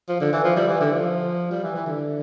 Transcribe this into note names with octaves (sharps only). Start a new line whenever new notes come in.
F3
D3
E3
F3
G3
E3
D3
F3
G3
E3
E3
D3